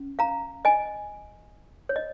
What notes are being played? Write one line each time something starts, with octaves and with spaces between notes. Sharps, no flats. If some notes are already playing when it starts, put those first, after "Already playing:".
Already playing: C#4
F5 A#5
D#5 G#5
C#5
D#5